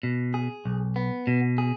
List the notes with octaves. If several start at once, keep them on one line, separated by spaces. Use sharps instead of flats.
B2
G#4
B1
B3
B2
G#4